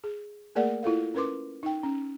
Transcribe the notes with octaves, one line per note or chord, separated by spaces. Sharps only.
G#4
A3 A#3 G#4 A#4 D5 F#5
E4 F4 A4 F5
C#4 A#4 B4 C6 D6
D#4 G5
C#4